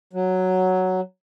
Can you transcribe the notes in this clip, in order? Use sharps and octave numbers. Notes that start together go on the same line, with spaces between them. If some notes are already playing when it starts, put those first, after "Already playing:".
F#3